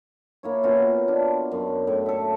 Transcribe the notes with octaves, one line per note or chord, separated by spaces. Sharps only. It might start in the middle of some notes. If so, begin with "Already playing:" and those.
A#3 E4 C#5
B2 C#4 F4 A#4
D4
F#2
A2
A4 E5